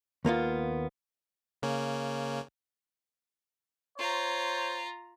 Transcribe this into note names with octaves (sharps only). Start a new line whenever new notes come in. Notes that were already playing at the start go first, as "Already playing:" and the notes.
D#2 A#3 B3 F4
C#3 A#3 C#4
F4 C5 C#5 A#5